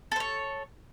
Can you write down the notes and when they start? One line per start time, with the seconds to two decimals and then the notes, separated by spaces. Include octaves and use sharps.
0.12 A4
0.16 C5
0.20 C#5